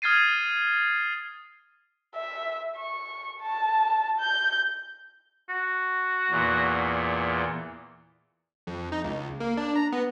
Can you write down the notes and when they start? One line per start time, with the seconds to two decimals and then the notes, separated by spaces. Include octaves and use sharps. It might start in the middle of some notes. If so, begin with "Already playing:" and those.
0.02 D#6 F6 G#6 A6 C7 D#7
2.16 E5
2.77 C#6
3.41 A5
4.20 G6
5.49 F#4
6.31 E2 A#2
8.67 F2
8.92 D#4
9.04 C#2
9.40 A#3
9.57 D4
9.75 A#5
9.92 B3